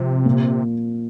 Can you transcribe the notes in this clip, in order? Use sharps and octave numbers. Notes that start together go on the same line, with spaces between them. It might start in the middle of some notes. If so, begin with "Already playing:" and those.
Already playing: C3 F3 C4 F4
A#2